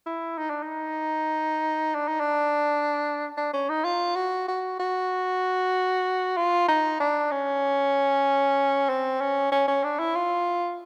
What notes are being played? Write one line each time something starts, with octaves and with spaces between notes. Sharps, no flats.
E4
D#4
D4
D#4
D4
D#4
D4
D4
C#4
D#4
F4
F#4
F#4
F#4
F4
D#4
D4
C#4
C4
C#4
C#4
C#4
D4
E4
F4